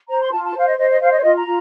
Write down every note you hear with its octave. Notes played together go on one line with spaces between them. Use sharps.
C5 A#5
C6
F4 A5
A5
C5 F5
D#5
C5 D#5
D#5
C5 F5
D#5
C#5
F4 D#5
A#5
F4